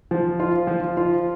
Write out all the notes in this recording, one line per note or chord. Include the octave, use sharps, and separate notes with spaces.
F3
F4
F3
F4